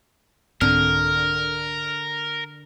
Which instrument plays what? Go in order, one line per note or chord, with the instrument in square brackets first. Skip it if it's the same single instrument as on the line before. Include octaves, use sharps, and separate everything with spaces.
[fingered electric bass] C2 G#2 C4 [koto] D3 [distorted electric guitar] A#4 [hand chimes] F6